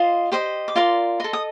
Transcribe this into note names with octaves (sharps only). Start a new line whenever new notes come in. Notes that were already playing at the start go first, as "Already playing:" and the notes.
Already playing: F4 C5 D#5
G4 C5 D#5
D6
F4 A#4 D5 C6
A4 D#5 C6
D#6